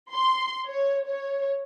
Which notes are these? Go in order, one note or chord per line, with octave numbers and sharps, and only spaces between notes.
C6
C#5
C#5